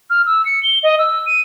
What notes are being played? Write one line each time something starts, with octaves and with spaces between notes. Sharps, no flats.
F6
E6
C#7
G7
D#5
E6
D#7